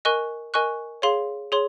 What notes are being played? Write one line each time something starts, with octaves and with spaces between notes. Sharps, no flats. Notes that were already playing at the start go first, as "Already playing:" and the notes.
A#4 D#5 G#5 C#6 F#6
A#4 D#5 G#5 C#6 F#6
G#4 C#5 F5 C6
G#4 C#5 C6